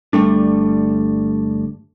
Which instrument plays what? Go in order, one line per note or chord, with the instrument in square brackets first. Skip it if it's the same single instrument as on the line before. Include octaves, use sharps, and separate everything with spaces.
[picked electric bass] G1 G3 A3 D4